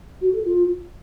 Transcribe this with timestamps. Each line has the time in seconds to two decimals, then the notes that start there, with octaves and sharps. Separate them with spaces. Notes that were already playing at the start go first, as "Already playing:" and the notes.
0.21 F#4
0.33 A4
0.45 F4